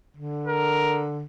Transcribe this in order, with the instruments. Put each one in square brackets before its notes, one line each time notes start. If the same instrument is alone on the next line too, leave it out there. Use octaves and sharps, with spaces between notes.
[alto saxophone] D3
[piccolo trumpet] A#4